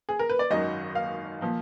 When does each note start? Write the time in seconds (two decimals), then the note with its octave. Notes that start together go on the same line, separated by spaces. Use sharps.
0.09 G#4
0.19 A#4
0.30 B4
0.39 D5
0.50 G#1 F#2 D#3 F#3 D#5
0.95 F5
1.41 A#2 F3